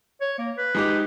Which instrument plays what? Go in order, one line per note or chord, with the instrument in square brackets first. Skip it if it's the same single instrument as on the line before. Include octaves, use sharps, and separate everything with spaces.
[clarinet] C#5
A#3
B4
[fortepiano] G#3 D#4 G4